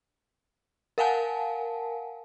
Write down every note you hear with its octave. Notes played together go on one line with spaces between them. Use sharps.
A#4 F5 F#5 G#5 A5